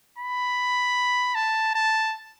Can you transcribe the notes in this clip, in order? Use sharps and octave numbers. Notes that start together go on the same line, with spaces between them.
B5
A5
A5